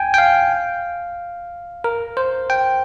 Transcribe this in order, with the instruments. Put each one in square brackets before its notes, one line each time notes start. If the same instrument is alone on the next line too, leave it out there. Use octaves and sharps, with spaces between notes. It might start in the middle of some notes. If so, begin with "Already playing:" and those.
Already playing: [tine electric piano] G5 G#5
G5
F5
A#4
C5
G5